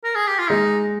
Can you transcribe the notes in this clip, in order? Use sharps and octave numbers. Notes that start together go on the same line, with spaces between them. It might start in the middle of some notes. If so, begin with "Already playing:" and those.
A#4
G#4
G4
F4
G#3 D#4